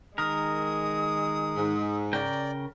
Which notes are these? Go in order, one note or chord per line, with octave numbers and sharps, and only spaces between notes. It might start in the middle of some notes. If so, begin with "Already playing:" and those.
D#3 G#3 A#4 D#6
G#2
C#3 A#4 D5 G5